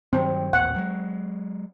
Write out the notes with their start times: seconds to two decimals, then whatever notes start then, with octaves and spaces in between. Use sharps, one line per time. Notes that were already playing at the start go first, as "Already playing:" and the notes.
0.13 G2 D#3 F#3 C4
0.53 A1 D#2 A#2 F#5
0.76 F#3 G#3